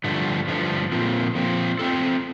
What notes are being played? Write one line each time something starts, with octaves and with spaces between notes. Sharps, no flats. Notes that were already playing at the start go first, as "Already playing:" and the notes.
G2 D3 F3 A3
G2 D3 F3 A3
A#2 F3 C4
A#2 F3 C4
A3 C4 F4 A4